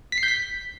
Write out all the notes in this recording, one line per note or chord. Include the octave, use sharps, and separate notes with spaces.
B6
C7
G6
B6